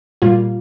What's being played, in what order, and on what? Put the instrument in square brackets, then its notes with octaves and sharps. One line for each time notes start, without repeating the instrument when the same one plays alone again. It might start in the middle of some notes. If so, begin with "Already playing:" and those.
[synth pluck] A#2 G3 A#3 F4